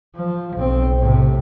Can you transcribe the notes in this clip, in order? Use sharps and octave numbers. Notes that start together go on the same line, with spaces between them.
F3
B1 C4
A2 C3